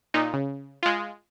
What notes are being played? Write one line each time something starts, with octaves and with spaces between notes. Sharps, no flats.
A#2 D#4
C#3
G#3 F4